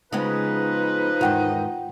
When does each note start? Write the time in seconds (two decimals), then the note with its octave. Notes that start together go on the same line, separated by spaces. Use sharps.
0.13 C#3 F3 G#3 B3 D#4 B4
1.21 E2 G#2 D#3 F4 F#5 G5